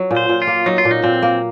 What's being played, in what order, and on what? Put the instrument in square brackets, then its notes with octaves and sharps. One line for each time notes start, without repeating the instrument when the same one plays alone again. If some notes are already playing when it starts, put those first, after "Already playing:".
Already playing: [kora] F#3
A#2
[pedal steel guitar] C5
[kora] A#2
[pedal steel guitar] F4
[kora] A#3
[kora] F#3 [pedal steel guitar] D#4
[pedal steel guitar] F4
[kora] A#2
[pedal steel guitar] D#4
[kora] A#2 [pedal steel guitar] C4
[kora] A#3